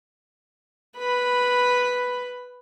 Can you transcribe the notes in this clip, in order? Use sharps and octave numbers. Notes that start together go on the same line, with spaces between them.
B4 B5